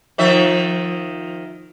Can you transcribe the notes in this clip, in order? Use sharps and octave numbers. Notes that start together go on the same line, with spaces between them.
D#3 F3 E5